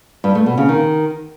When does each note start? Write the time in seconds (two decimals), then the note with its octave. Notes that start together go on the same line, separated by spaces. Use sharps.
0.24 G2
0.35 A3
0.46 B2
0.57 C#3
0.69 D#3